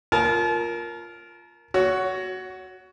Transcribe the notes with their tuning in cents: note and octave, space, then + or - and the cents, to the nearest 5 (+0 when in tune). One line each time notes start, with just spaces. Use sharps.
F4 +0 A#4 +0 A5 -35
F#4 +5 C#5 +25